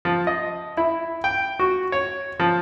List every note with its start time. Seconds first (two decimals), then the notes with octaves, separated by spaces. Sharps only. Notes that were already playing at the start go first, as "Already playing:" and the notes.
0.05 F3
0.27 D#5
0.77 E4
1.24 G5
1.59 F#4
1.92 C#5
2.40 F3